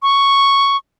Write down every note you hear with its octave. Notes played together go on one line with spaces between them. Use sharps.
C#6